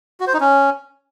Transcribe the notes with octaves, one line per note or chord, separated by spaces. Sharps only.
F#4
C5
D#4
C#4